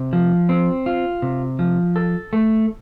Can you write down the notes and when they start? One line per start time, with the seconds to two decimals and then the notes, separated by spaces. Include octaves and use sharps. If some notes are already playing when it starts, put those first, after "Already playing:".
Already playing: C3
0.13 F3
0.49 C4
0.86 F4
1.22 C3
1.59 F3
1.96 A4
2.33 A3